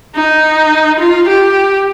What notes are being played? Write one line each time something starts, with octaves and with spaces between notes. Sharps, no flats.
D#4
F4
G4